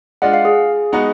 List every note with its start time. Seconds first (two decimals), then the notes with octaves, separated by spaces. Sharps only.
0.22 G#3 D4 F4 F#5
0.34 F5
0.45 G#4
0.92 G#3 B3 D#4 F#4